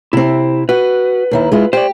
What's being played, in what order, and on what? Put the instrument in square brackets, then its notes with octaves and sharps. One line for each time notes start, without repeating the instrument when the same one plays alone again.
[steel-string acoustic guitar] C3 C4 [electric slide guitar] E4
[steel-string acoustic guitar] F#4 [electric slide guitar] B4
[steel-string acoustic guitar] D#2 D#3 E4
G#3 E4 F4
[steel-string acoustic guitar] G4 [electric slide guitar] C5 D5